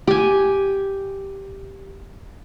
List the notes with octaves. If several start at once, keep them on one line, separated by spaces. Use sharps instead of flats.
G4 G#5